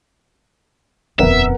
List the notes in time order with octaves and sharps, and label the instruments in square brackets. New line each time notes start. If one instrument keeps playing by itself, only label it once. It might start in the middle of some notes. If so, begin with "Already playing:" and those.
[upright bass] D#1 F2 [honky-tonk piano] B3 A#4 F#5 [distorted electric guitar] E5